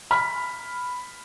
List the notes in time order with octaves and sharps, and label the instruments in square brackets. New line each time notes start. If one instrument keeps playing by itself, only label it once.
[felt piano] B5 F6 B6